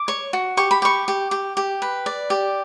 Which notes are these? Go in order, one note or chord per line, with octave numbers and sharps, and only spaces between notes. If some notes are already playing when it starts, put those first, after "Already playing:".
Already playing: D6
C#5
F#4
G4 C#6
B5
G4 C#6
G4
G4
G4
B4
D5
G4